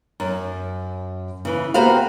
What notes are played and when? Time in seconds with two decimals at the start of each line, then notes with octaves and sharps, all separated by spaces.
0.20 F#2
1.45 C#3 E3
1.74 A#3 B3 F#4 G4 C5 F5